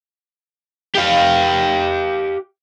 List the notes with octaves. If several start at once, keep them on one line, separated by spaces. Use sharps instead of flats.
G4 F5